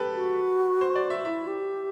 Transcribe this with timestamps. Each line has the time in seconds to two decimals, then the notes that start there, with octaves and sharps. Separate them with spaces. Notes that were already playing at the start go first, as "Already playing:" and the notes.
Already playing: G4 A4 B4
0.15 F#4
0.81 C5
0.95 D5
1.10 E5
1.25 E4 E5
1.47 G4